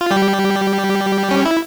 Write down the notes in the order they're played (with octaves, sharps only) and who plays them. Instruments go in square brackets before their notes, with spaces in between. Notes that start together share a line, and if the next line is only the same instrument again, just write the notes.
[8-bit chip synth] F4
G3 G4
C#4
E4